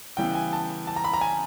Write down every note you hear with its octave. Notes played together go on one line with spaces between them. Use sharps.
C#3 E3 G3 B3 G5
G#5
A5
A5
A#5
B5
A#5
G#5